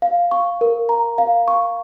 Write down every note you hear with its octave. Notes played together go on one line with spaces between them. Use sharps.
F5
C#6
A#4
A#5
F5
C#6